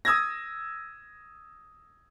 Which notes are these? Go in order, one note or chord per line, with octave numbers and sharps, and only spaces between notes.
D#6 E6 G#6 A#6